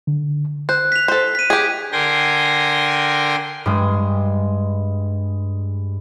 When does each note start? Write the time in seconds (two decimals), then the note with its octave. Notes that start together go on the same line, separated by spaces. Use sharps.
0.07 D3
0.69 C5 F#6
0.92 B6 F7
1.08 A4 C5
1.35 B6 D#7
1.50 G4 G#4
1.92 D3 A#4 G5 G#5 C6 A#6
3.66 G2 G#3